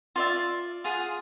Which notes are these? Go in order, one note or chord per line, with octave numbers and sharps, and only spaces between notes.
F4 D5 E5
F4 G#4 F#5